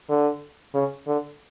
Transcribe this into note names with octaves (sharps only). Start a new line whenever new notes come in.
D3
C#3
D3